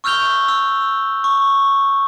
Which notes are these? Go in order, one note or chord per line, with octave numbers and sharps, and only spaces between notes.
C#6 E6 F6 G6 F7 G7
E6
C#6